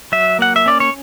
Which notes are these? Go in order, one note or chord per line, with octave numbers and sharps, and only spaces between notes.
F#3 E5
A#3 F#5
E5
C#4 D5
C#5